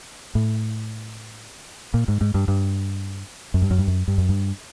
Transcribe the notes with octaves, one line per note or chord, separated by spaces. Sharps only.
A2
A#2
G#2
G#2
G2
G2
F#2
G2
F#2
G2
F#2
G2
F#2
G2